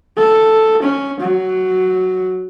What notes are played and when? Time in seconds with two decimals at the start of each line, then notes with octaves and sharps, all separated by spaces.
0.18 A4
0.83 C#4
1.20 F#3